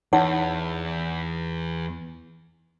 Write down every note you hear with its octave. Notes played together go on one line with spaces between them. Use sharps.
E2 D#4 C#5 F#5